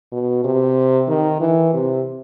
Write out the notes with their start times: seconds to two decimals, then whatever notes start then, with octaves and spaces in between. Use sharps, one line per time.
0.12 B2
0.45 C3
1.08 D#3
1.41 E3
1.74 C3